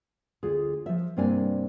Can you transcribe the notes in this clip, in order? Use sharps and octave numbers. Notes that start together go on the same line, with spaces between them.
D2 F4 G#4
F3 E5
G2 C3 A#3 C4 D4 G#5